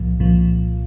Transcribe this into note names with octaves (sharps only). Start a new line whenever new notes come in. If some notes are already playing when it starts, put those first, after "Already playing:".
Already playing: C2 A#2 F3
C2 A#2 F3